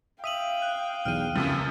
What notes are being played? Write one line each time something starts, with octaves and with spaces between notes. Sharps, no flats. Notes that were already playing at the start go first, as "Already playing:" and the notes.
E5 F5 G5 D#6 D#7 F#7
F#6
B1 E2 F6 D#7
C#2 F#2 C3 F3